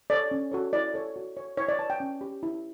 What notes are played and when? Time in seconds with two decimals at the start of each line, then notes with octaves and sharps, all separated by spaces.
0.10 A4 C#5 D5
0.31 C#4
0.52 F#4 A4 C#5
0.73 E4 D5
0.94 A4 C#5
1.16 F#4
1.37 C#5
1.57 E4 C#5
1.68 D5
1.79 B4 A5
1.90 G5
2.00 C#4
2.21 G4 C#5
2.43 E4